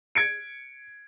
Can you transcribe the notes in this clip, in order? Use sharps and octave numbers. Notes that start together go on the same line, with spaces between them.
G#6 C#7 D7